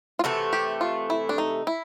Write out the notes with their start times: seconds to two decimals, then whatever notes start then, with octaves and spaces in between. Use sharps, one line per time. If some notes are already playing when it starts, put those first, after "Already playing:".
0.19 F4
0.24 C3 E3 A3 F#4
0.53 G4
0.81 F4
1.10 E4
1.29 D4
1.38 D#4
1.67 E4